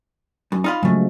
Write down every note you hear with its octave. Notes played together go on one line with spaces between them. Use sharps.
F#2
D#4 F4 B5
C#3 F3 F#3 G#3 A3